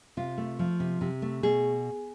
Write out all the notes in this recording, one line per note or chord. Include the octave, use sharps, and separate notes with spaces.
C3 F4
A3
F3
C3
C3
A3
B2 G#4